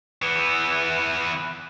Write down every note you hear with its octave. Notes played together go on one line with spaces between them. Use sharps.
E3 B3